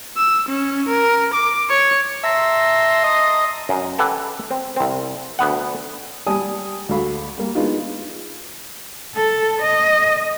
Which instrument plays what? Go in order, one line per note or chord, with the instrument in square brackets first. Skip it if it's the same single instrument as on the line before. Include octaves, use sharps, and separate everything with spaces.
[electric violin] E6
C#4
A#4
D6
C#5
[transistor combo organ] E5 [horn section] A5 A#5 C6
[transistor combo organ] D#5
[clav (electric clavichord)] F#2
G4 A4 B4 F#5 G#5
C4
C2 C4
D2 B3 F#5
[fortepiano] G3 D5 G#5 A5 D#6
D2 F#4 A4 F5 B5
G3 A#3
G#3 B3 D4 D#4 F4 F#4
[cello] A4
D#5